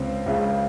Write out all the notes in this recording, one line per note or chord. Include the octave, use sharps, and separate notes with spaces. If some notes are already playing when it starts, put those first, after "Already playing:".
Already playing: C#2 C#3 C4
C#2 C#3